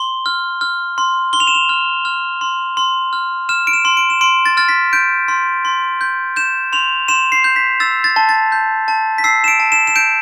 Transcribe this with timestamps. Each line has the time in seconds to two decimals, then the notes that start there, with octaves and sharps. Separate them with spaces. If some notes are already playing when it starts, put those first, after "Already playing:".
Already playing: C6 G7
0.26 F6
0.61 F6
0.98 C6
1.33 C6 G7
1.40 F7
1.47 E7
1.55 F7
1.69 F6
2.05 F6
2.41 C6
2.77 C6
3.13 F6
3.49 F6 E7
3.67 D7
3.73 E7
3.85 C6
3.97 D7
4.10 E7
4.21 C6 D7
4.45 A6
4.57 F6 A6
4.69 B6
4.93 G6 D7
5.28 C6
5.65 C6
6.01 G6
6.36 G6 E7
6.73 C6 F7
7.08 C6 E7
7.32 C7
7.44 G6
7.56 B6
7.80 E6 A6
8.04 A6
8.16 A5
8.29 A6
8.52 G6
8.88 A5
9.18 B6
9.24 E6 C7
9.44 E7
9.48 D7
9.60 A5
9.72 E7
9.87 E7
9.96 G6 D7